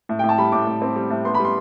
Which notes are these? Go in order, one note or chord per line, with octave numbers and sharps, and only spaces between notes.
A2
G5
A2
A5
G3 B5
A2 D6
A2
C4
G3
A2
B3 C6
B5
G3
C6